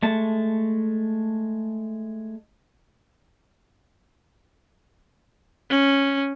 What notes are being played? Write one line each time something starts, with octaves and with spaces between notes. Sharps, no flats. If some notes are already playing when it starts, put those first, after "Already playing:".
G#3 A3 A5
C#4